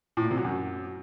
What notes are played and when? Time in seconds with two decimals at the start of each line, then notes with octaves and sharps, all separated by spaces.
0.17 A2
0.24 A#2
0.31 C3
0.38 F#3
0.44 F#2